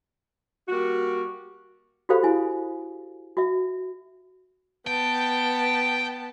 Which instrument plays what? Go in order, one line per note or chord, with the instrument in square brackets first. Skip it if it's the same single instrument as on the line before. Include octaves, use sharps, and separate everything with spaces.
[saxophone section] G3 A#3 F#4
[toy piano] F#4 G4 A4 C5 F5 B5
E4 G#5
F#4 E5
[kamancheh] B3 A5 [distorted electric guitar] G5